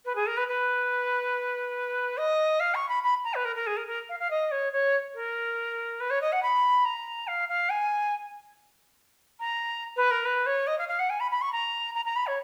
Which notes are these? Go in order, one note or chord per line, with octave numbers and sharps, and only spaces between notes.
B4
G#4
A#4
B4
B4
D#5
F5
C#6
B5
B5
A#5
B4
A#4
A#4
G#4
A#4
A#4
F5
F5
D#5
C#5
C#5
A#4
B4
C#5
D#5
F#5
B5
A#5
F5
F5
G#5
A#5
B4
A#4
B4
C#5
D#5
F5
F5
F#5
G#5
B5
B5
C#6
A#5
A#5
A#5
B5
C#5